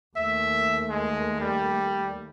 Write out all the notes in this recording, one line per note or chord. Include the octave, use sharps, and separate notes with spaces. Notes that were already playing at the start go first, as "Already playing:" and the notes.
D#2 A3 E5
G#3
G3